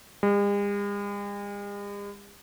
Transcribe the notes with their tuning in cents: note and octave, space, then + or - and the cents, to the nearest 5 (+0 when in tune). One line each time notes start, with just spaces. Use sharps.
G#3 -45